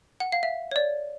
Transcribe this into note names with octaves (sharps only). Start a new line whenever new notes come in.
F#5
F5
E5
C#5
D5